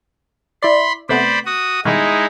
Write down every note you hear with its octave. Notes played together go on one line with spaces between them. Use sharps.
E4 D5 B5 C6
C3 A3 B3 C5 D5 B5
F#4 D#6
B2 D#3 G3 G#3 D#4 E4